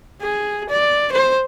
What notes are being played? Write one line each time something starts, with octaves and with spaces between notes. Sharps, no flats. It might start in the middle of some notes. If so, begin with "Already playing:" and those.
G#4
D5
C5